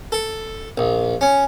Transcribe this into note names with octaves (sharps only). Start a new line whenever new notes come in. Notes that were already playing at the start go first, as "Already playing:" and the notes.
A4
A#1
C#4